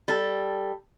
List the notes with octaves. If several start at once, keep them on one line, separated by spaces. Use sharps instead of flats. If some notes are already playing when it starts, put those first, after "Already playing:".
G3 A4